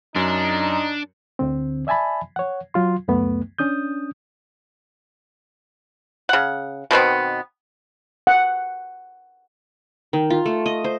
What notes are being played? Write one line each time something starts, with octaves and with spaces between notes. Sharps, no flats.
F#2 D4 D#4
D2 D3 C4
D5 E5 G#5 A5 B5
C#5 F#5
F#3 F4 C6
C#2 F#2 A3 B3
C#4 D4 D#6 G6
C#3 F#5
B2 D#3 B3 C4
F#5
D#3
F4
A3
D#5
C5